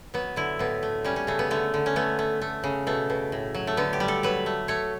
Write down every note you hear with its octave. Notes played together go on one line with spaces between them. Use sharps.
F#3 B3
D3 E4
A2 B3
A3
G3 C#4
C#4
C#3 A3
B3
D3 A3
D3
C#4
A3 B3
A3
A3
C#3
B2 A3
B2
A2
F#3
A3
D3 B3
G4
G3
A4
F#3 B4
A3
A3 C#5